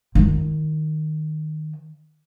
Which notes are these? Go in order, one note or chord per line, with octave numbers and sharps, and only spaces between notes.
D#3 E4